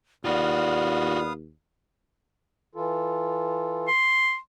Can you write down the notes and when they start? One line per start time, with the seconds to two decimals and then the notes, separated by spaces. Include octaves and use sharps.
0.25 D#2 B3 F4 F#4 D5 F5 D#6
2.75 E3 F4 A4
3.87 C6